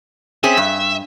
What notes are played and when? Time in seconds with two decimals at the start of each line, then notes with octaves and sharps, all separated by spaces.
0.43 C4 C#4 G#4 E5
0.57 G2